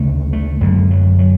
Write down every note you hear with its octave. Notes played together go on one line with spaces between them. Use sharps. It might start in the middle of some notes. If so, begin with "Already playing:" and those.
Already playing: D2 C#3 A3
A3
F#2 D3 G#3
F#3
F#3